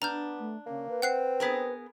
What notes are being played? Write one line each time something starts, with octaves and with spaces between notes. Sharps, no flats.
B3 D4 A#5 F6 G6
A3
C#3 A#3
B4
C4 F#5 F#6 C7
B3 G#4 A#4